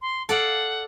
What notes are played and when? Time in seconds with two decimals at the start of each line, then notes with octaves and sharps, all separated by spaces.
0.02 C6
0.29 A4 D5 F5 F#5